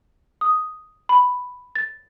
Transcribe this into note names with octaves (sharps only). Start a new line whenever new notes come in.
D#6
B5
A6